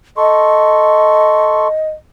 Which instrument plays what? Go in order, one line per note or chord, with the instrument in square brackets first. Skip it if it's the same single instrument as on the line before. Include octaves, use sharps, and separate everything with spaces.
[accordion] A4 C6 C#6 [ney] D#5